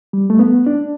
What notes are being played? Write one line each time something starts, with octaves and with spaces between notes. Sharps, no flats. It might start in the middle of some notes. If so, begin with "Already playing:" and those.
G3
A3
B3
D4